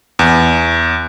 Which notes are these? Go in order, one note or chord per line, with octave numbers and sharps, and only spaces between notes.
E2